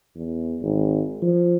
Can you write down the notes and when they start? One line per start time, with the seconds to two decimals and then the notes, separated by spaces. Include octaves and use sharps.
0.16 E2
0.61 G#1
1.22 F3